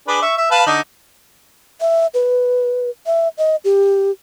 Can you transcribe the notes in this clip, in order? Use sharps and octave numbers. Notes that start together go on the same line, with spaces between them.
D4 G#4 B4
E5 C#6
E5
B4 F5 A5
D3 D4 D#4
E5
B4
E5
D#5
G4